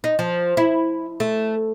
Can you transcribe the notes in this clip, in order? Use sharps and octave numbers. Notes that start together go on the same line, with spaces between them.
D#4
F3
E4
A3